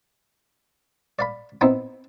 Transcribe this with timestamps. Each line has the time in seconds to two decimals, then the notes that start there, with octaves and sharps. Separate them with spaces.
1.19 D5 F5 B5
1.61 B3 C4 D#4 E4